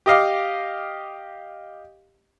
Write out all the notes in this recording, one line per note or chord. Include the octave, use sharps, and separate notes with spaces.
G4 D#5 F5 D6